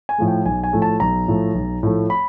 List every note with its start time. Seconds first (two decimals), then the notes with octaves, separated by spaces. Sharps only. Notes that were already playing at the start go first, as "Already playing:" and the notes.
0.09 G#5
0.18 A2 F3 A3
0.28 G5
0.45 B1 G#5
0.64 G#5
0.73 A2 F3 A3
0.82 A5
1.00 B1 A#5
1.28 A2 F3 A3
1.55 B1
1.83 A2 F3 A3
2.10 B5